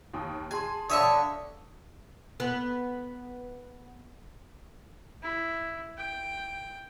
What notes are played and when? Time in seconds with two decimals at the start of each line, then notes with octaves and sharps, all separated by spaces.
0.14 D#2 G5 D#6
0.51 G#4 G#5 A5 C6
0.90 D3 C#5 E5 F5 G5 A5 C#6 D#6
2.40 B3
5.23 E4
5.97 G5